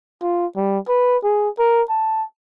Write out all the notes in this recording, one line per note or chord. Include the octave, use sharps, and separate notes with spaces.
F4
G3
B4
G#4
A#4
A5